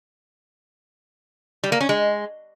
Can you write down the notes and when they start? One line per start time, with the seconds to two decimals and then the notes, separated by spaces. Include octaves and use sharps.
1.64 G3
1.72 A#3
1.81 C#4
1.89 G#3